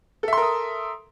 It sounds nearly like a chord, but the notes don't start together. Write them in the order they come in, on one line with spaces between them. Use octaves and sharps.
A4 E5 C6 A#4 D#6